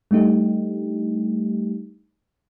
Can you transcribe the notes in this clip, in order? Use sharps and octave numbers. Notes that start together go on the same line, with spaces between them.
G3 A3 D4 D#4 G4